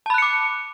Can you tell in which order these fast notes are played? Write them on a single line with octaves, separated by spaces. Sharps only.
A5 B5 F#6 C#7 D6